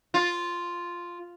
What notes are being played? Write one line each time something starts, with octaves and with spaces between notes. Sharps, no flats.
F4